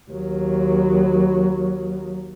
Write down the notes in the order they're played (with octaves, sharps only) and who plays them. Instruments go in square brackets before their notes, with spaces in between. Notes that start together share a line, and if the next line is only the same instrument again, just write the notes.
[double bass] D#2 F#3